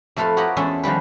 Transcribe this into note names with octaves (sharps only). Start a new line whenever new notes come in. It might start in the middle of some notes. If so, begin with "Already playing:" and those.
F2 A3 A4 B4 F5 C6
F#4 G4 A#4 C#5 D#5 F#5
E2 G#3 C#4 A4 E5 C6
D#3 F3 G3 B4